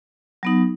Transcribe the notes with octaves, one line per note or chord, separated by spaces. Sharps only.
F#3 B3 D#4